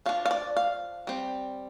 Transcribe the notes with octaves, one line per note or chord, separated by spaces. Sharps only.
F3 D4 F5
F5
D5
F5
G3 C4